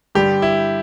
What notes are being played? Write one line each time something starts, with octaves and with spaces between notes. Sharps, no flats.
G2 D3 G3 G4
E4